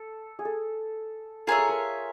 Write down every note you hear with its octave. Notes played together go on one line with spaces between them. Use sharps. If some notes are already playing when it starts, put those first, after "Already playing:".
Already playing: A4
G#4
A4
F4 G#4 A#4 C#5 E5
A4
A#4